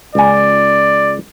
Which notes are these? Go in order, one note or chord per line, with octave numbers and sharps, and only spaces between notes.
C#2 D5 G#5